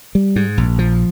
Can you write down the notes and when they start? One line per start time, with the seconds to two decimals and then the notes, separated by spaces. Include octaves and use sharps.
0.15 G3
0.36 G#2
0.58 A#1
0.79 F3